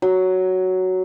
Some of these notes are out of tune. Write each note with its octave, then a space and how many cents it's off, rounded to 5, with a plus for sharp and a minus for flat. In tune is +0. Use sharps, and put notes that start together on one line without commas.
F#3 +5